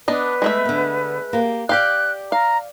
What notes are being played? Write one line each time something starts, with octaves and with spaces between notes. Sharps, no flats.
B3 D4 B4 D#5
G#3 A3 E5
D3 B3
A#3 G4
G4 D5 F5 G5 F#6
F5 A#5